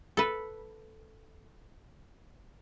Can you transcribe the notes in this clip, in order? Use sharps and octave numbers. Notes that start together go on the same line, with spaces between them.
A4 B4